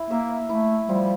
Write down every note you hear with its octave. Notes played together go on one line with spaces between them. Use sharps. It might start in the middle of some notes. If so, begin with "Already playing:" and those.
Already playing: E4
A#3 E5
A3 E4
F3 G3